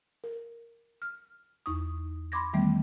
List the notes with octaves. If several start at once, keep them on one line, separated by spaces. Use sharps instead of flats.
A#4
F6
E2 D#4 C#6 D#6
B5 C6 D6 G#6 A#6
D#3 E3 G3 A3 B3